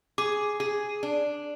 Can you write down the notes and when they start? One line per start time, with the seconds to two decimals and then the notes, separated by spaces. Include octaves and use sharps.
0.18 G#4 D6
0.60 G#4
1.03 D4